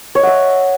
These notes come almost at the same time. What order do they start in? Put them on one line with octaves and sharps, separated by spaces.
C#5 D#5 F#5 E5